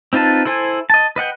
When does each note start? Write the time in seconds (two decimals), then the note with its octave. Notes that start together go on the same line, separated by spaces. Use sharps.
0.13 C4 D#4 F4 B4 A5
0.45 E4 A4 C5 G#5
0.90 D#5 A5
1.16 B4 D#5 F#5 G5